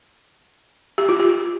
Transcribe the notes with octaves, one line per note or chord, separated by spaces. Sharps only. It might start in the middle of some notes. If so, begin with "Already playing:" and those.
G4
F4
G4